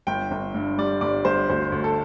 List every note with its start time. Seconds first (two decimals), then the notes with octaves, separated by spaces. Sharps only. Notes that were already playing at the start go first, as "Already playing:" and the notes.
0.07 G1 G5
0.31 G1
0.54 G2
0.78 G3 D5
1.01 G1 D5
1.25 G1 C5
1.50 D2 C5
1.72 D2
1.84 A4